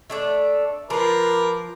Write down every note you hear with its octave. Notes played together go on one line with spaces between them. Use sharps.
A3 D4 D5
F3 F4 A#4 B4 D6